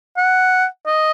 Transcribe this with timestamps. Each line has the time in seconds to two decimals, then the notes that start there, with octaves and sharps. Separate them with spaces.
0.17 F#5
0.86 D#5